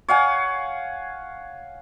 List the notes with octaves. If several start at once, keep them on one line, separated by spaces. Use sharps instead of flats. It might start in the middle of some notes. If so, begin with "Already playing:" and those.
C#5 F5 F#5 G#5